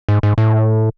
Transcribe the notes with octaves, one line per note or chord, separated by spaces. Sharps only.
G#2
G#2
A2